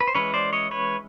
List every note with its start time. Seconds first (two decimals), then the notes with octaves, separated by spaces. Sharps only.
0.01 B4
0.08 C5
0.15 E3 G#3 C#4 B4 C#5
0.34 C5 D5
0.53 C#5 D#5
0.71 B4 C#5